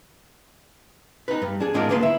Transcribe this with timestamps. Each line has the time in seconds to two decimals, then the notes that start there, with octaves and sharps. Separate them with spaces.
1.28 D#4 B4
1.42 G2
1.60 D4 G#4
1.74 G#2 G#3 D4 F4 A#4 D5
1.89 D2 A#3 B4 E5 C6
2.03 E4 E5